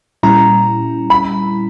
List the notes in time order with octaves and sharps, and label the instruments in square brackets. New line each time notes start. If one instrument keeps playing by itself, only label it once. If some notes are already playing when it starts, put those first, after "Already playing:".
[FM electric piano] A#2 G3 C#4 E4 [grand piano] A#5
[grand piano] B5